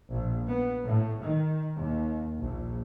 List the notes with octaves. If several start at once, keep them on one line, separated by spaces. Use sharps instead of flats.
A#1
B3
A2
D#3
D#2
A#1